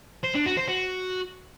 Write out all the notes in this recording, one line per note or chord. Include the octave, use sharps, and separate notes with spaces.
C5
D4
F#4
C5
F#4